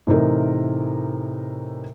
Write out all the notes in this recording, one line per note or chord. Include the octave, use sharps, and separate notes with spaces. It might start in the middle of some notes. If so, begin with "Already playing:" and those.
A2 C3 E3 D#4 A#4